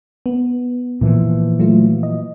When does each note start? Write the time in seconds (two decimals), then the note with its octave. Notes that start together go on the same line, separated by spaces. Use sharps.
0.26 B3
1.01 A#2 E3 F3
1.59 F#3 A3 F4
2.03 D#5